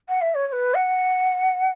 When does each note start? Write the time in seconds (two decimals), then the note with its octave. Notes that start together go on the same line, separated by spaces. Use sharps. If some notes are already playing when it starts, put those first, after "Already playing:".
0.08 F#5
0.21 E5
0.34 C#5
0.47 C#5
0.52 B4
0.74 F#5